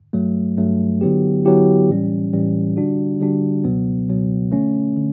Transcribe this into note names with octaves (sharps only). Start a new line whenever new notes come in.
G2 F#3 A3
G2 F#3 A3
D3 F#3 B3 E4 G4
D3 F#3 B3 E4 G4
A2 E3 G3 C#4
A2 E3 G3 C#4
D3 G3 D4 F#4
D3 G3 D4 F#4
C#2 B2 F#3 B3
C#2 B2 F#3 B3
D3 A3 C#4
D3